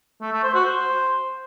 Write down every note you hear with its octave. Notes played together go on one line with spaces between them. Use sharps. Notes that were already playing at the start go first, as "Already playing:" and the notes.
A3
A3
C5
F#4
C5